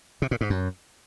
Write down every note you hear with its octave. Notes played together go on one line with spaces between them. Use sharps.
C3
A#2
G#2
F#2